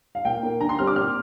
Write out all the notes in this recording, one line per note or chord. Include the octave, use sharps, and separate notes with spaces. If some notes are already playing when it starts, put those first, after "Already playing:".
F5
A#2 G5
A#3
D3 A#5
C6
G3 C4 F6
D6
A#2 F6